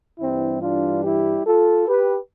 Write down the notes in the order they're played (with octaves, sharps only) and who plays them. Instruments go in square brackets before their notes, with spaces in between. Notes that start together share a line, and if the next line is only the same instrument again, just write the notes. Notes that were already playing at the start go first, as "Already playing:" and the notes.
[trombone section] G2 E3 G3 C4 E4
D4 F4
E4 G4
F4 A4
G4 B4